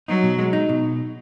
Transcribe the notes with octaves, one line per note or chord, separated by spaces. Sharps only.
F#3 D#4
B2
G#3
D#4
B2